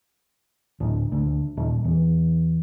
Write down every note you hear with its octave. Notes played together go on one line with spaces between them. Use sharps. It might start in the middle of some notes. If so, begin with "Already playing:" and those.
D1
D2
D#1
E2